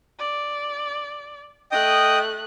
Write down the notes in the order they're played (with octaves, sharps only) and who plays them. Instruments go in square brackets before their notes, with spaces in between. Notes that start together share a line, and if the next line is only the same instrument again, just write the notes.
[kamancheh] D5
[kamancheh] A3 F#6 [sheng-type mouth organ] D#5 G5 D#6